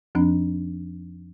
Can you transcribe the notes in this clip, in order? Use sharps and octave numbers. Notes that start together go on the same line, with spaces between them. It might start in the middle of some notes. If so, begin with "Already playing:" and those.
F2 F3 C4 D4